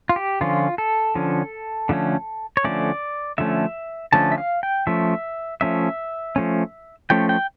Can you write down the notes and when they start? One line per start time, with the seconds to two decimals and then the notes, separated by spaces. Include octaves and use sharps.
0.09 F4
0.16 G4
0.41 D3 F3 C#4 F4
0.78 A4
1.15 D3 F3 C#4
1.89 D3 F3 A3 C#4
2.57 C#5
2.64 D3 F3 A3 C#4 D5
3.38 D3 F3 A3 C#4 E5
4.12 D3 F3 A3 C#4 A5
4.32 E5
4.38 F5
4.63 G5
4.87 F3 A3 C#4 E5
5.61 F3 A3 C#4 E5
6.36 F3 A3 C#4
7.10 F3 A3 C#4 G5
7.29 G5